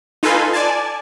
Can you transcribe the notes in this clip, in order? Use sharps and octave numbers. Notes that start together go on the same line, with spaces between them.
D#4 F4 A4 B4 G#5 C6
D5 G#5 A5